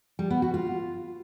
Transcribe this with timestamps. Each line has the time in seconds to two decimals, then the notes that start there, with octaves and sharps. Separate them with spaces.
0.19 G3
0.30 B3
0.42 F#4
0.54 F4